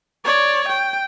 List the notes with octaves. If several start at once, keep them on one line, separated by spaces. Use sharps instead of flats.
C#5 D5
G5